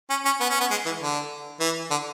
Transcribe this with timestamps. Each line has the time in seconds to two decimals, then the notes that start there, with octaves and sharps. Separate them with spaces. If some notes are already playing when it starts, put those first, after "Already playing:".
0.10 C#4
0.25 C#4
0.41 B3
0.51 C#4
0.61 B3
0.71 G#3
0.86 E3
1.01 D3
1.60 E3
1.91 D3